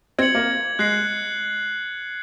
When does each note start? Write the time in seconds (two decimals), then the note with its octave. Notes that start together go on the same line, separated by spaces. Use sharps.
0.19 C4 G#6
0.22 C#7 F#7
0.35 A#3
0.79 G#3 F#6 C7 F#7